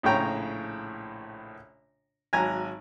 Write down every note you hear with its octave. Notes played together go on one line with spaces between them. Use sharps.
A#1 A2 C#3 C#5 G5 A#5
G#1 F#3 G#5 A#5